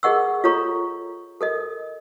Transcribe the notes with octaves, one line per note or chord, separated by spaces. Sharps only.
G#4 A#4 D#5 F#5 C#6 E6
F4 A4 C#5 A#5 C#6
A4 A#4 D#5